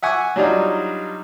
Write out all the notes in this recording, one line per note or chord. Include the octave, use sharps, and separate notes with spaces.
E5 F#5 G#5 C#6 D6
F#3 G3 D4 D#4 F4